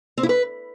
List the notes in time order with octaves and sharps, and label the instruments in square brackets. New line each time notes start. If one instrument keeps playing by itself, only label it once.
[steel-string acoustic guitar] C4
E4
B4